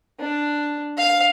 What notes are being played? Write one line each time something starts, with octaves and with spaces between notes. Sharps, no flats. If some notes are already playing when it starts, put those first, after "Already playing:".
D4
F5